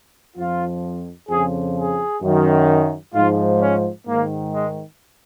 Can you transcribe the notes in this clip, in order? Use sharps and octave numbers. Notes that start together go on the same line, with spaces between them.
F2 F3 F4
F2 C#3 F3 G#4
G#4
F#2 D#3
G#2 F3 F4
C#4
G#2 D#3 A#3
G#3